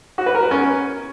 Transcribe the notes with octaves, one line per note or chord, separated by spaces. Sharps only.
F#4
B4
A#4
B4
C#4